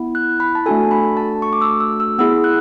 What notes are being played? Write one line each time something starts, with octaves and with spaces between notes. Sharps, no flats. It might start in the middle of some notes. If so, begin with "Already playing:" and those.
Already playing: B3 E4
F#6
B5
A5
A3 D4 F#4 A4 G#5
B5
A5
C#6
D6
E6
E6
E6
B3 E4 G#4 E6
F#6